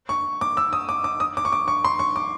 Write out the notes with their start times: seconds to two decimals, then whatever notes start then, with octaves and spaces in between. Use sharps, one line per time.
0.09 C#6
0.41 D6
0.57 E6
0.73 D#6
0.89 D6
1.04 D6
1.20 D#6
1.37 D6
1.45 C#6
1.52 D6
1.68 C#6
1.85 C6
1.99 C#6
2.16 D6